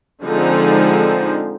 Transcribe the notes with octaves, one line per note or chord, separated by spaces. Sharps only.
D3 F3 G#3 C4 D#4